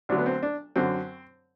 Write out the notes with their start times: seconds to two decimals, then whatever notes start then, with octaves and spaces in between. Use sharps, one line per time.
0.09 D2 D3 F#3 D4
0.18 B3
0.26 C4
0.43 D4
0.76 F#2 D3 F#3 C4